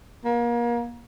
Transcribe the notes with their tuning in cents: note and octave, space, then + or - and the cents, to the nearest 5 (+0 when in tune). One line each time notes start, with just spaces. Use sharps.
A#3 +35